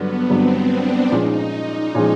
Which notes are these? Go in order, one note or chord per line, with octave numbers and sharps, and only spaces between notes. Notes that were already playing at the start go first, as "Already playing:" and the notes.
Already playing: G2 D3 F#3 B3
G2 D3 F#3 B3 C4
D4
A#2 F3 G#3 C#4 D#4
A#2 F3 G#3 C#4